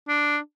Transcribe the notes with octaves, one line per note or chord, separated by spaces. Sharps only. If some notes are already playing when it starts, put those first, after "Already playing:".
D4